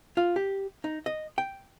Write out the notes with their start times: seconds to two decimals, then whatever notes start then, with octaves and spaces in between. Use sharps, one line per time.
0.17 F4
0.36 G4
0.84 D#4
1.06 D#5
1.38 G5